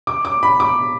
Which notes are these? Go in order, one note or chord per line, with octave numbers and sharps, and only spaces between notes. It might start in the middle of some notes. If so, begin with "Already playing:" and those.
D6
D6
B5
D6